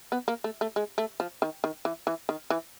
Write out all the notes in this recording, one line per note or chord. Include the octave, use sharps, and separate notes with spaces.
B3
A#3
A3
A3
G#3
A3
F3
D#3
D#3
E3
E3
D#3
E3